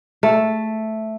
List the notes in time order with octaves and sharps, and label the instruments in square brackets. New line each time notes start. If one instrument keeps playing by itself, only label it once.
[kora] A3